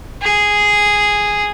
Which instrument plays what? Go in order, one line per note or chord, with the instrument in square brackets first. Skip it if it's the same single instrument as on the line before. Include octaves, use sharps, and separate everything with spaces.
[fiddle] G#4